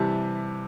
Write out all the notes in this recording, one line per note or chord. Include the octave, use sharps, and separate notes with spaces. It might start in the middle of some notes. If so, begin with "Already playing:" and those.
Already playing: C3 E3 G3 A5